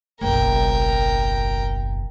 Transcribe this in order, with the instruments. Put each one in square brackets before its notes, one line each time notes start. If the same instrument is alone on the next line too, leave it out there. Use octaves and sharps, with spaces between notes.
[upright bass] F#1 B1 [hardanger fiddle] A#4 G5